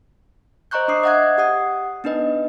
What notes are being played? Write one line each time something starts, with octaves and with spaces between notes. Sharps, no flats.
C5 D#5 A#5 C#6 F#6 G6
D4 D6 D#6 C7
D#5 E5 F#5 D#6 F#6 G#6
G4 F#5 D#6
B3 D4 D#4 B4 D#5